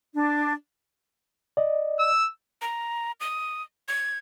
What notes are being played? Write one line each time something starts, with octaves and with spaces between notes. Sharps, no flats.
D4
D5 D#5
E6
A#5
D#6
G#6